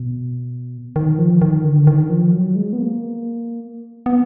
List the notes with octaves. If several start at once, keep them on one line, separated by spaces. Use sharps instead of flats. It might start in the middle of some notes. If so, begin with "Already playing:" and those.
Already playing: B2
D#3
F3
D#3
D3
D#3
F3
F#3
G#3
B3
A#3
B3